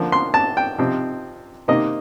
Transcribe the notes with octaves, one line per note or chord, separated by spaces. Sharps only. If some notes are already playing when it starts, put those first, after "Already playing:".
Already playing: D3 F3 A#3
C6
A5
G5
C3 F3 C4 D#4
C3 D#3 A#3 D#4 D#5